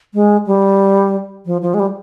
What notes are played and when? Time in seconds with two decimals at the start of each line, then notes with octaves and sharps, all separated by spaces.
0.14 G#3
0.47 G3
1.46 F3
1.62 F3
1.74 G#3
1.80 G3